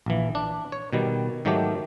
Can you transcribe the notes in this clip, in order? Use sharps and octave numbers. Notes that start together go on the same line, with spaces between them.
A#1 E3
D4
C#5
B2 D#3 G3
G#2 D#3 F#3 A3 G4